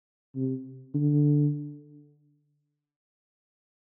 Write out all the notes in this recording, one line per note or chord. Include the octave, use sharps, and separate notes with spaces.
C3
D3